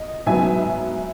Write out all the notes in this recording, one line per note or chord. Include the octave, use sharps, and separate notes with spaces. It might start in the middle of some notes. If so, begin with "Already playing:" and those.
Already playing: D#5
G#2 F#3 B3 E5 G#5